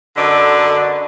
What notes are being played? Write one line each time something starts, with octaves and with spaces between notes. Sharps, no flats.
F#2 D3 A4 B4 D5 D#5